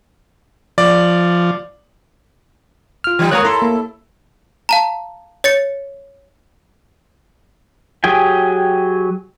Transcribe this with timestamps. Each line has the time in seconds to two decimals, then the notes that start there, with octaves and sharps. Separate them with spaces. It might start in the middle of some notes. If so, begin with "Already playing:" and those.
0.78 F3 D5
3.04 F4 F6
3.19 E3 G3 D#4
3.31 G#3 A#3 C#5 A#5 D#6 F#6
3.45 E4 A4 A#5 C6
3.62 A#3
4.69 F5 A5 A#5
5.44 C#5 A6 C#7
8.04 F#3 G4 G#4 G5 G#5